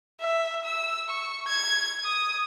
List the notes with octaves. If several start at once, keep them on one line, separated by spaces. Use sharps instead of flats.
E5
E6
C#6
G#6
D#6